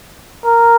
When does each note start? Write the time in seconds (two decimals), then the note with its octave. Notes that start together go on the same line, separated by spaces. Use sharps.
0.46 A#4